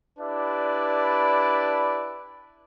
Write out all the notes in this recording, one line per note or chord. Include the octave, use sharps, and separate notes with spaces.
D4 E4 G4 B4 D5